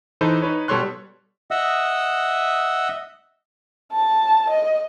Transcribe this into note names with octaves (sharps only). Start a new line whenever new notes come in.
E3 D#4 A4 B4 C5
D#4 B4 C#5
B2 G3 A4 C#5 C6 F#6
D#5 E5 F#5 D#6 E6
A5
D#5